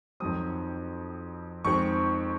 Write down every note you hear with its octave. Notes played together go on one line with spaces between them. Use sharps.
F2 D#3 F#3 C4 D#6
F2 D#3 G#3 C4 C#6